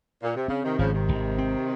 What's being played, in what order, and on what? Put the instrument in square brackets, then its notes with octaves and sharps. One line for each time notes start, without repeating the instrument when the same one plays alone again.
[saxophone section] A#2
C3
[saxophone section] C#3 [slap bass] C4
[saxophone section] C3 D#3
[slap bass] G#1 [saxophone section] C#3 F3
[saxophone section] C3 D#3
[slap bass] G#1
C4